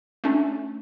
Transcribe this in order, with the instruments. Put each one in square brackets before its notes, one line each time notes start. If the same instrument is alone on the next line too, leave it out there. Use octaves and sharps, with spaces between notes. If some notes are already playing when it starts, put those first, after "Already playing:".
[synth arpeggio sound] A3 C#4 D4